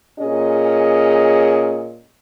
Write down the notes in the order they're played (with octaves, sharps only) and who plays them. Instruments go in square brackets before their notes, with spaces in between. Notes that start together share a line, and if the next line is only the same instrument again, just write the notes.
[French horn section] A#2 C#4 G#4 D#5